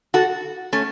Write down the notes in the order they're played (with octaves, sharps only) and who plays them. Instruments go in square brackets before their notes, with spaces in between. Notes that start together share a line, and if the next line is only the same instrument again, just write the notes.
[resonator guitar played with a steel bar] F#4 A4
A3 C#4